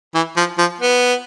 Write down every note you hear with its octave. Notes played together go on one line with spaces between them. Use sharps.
E3
F3
F3
B3